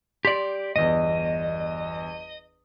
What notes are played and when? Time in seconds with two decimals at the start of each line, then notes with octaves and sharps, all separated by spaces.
0.25 G4 D5 C6
0.76 G1 E2 D#5